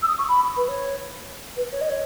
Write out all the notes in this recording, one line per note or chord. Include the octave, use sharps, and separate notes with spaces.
E6
D#6
C#6
B5
B4
C#5
B4
C#5
D#5
C#5